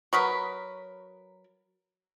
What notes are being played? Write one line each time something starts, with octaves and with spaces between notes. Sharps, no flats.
F#3 A#4 B4 C#6 D#6 B6